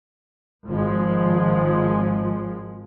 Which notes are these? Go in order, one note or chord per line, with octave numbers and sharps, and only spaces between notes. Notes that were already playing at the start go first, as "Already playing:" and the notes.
G#1 F3 G#3